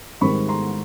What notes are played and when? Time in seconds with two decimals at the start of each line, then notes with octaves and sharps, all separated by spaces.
0.21 G#2 D#3 G3 C4 B5 C#6
0.48 A#5 C6